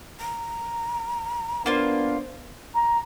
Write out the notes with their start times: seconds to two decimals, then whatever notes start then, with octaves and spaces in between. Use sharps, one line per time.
0.20 A#5
1.66 A#3 B3 D4 F4 C5
2.74 A#5